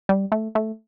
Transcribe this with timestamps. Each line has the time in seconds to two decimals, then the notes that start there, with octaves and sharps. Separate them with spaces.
0.09 G3
0.32 A3
0.55 A3